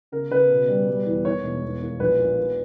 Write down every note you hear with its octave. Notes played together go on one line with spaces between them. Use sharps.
C#3 A#4
C#3 B4
B2
G3
G3
E2
D#3 C#5
E1
E1
D#2
A#1 B4
A#2
D#2